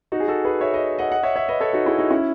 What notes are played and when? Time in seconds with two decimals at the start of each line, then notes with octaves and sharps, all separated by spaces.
0.12 D#4 F#4
0.20 G#4
0.28 F#4 A4
0.45 G#4 B4
0.61 C#5 E5
0.73 B4 D#5
0.99 D#5 F#5
1.10 D#5 F#5
1.23 C#5 E5
1.36 C#5 E5
1.49 B4 D#5
1.60 A4 C#5
1.73 D#4 F#4
1.85 E4 G#4
1.98 D#4 F#4
2.11 C#4 E4